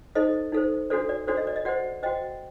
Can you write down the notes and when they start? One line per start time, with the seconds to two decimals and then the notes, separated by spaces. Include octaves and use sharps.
0.15 D#4 A4 C5 D#5
0.52 D#4 A4 C5
0.90 D4 F#4 A4 C5 D5
1.09 D5
1.27 D4 F#4 A4 C5 D5
1.37 D#5
1.47 D5
1.56 D#5
1.65 F#4 C5 D5 F#5
2.03 F#4 C5 D#5 G5